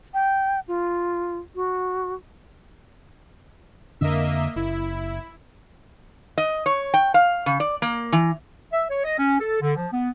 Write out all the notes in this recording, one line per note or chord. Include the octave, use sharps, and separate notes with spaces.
G5
F4
F#4
F2 D3 A#3 D4 D#5 E5
F#1 E4
D#5
C#5
G5
F5
C#3
D5
A#3
E3
E5
C#5
D#5
C#4
A4
D3
F3
B3